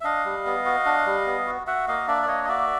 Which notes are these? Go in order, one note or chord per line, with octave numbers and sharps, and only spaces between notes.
E5
D4 D#5 F5
G3
B3
F#4
D4
G3
B3
F#4
F#4 E5 F#5
A#3 D#5 F5
D4 D5 E5
D5
A#3 C#5 D#5
D#5
F#4 D5 E5